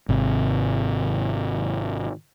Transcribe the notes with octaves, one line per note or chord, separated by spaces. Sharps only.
G#1 C3